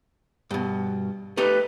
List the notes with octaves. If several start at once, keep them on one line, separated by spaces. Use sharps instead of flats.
G2 B2
A3 D#4 G4 B4